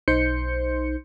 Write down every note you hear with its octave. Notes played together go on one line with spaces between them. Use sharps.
B1 D#4 C5 C6 G6 C#7